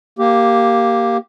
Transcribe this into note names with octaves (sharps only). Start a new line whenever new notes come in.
A#3 G4